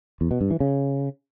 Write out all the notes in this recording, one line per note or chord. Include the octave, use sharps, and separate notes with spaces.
E2
B2
G2
E3
C#3